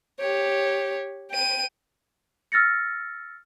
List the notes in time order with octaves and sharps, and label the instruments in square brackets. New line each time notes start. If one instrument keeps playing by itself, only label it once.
[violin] G4 C#5
G5 D#7
[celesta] E6 F6 A6 A#6 C#7